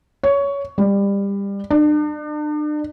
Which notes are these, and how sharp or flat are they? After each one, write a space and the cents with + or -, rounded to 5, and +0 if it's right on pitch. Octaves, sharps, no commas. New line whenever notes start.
C#5 +15
G3 +25
D4 +40